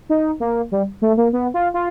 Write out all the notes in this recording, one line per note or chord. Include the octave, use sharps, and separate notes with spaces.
D#4
A#3
G3
A3
A#3
B3
F4
F4